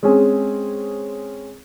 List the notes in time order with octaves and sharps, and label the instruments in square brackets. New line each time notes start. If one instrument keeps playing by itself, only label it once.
[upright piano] G#3 C4 C#4 G#4